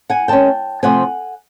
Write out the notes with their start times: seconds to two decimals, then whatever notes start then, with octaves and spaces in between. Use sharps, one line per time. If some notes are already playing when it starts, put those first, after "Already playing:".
0.09 F#5 G#5
0.28 D#3 G#3 C#4 G5 A5
0.83 C3 F3 A3 C4 F#5 G#5